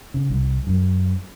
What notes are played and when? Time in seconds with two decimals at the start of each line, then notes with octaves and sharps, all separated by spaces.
0.14 C#3
0.30 C2
0.67 F#2